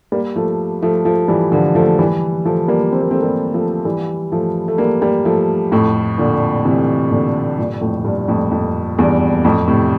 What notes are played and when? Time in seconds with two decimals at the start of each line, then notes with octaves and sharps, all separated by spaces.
0.12 G3 A#3
0.36 F3 A3
0.82 F3 A3
1.05 F3 A3
1.28 E3 G3
1.52 D3 F3
1.75 F3 A3
1.99 E3 G3
2.45 F3 A3
2.68 G3 A#3
2.92 C4
3.01 A#3
3.11 A3 C4
3.22 G3 A#3
3.54 F3 A3
3.85 E3 G3
4.32 F3 A3
4.68 A3
4.78 G3 A#3
5.02 G3 A#3
5.25 F3 A3
5.72 F2 A2
6.18 A#2 D3
6.65 C3 E3
7.11 A#2 D3
7.58 G2 A#2
7.81 F2 A2
8.05 G2 A#2
8.28 F2 A2
8.51 F2
8.98 E2 G2
9.45 F2 A2
9.68 A2 C3